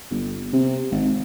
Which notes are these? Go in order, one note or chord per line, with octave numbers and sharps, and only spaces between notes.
G1
C3
G#1